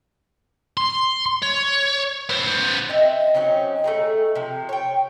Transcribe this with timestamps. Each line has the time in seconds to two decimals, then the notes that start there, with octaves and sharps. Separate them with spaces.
0.77 C6
1.43 C#5
2.30 B3 C5
2.89 C4 D#5 E5
3.34 F#3 C4 C#4 D#4
3.84 A3 D#4 G#4
4.35 C3 F3
4.69 C#5 G5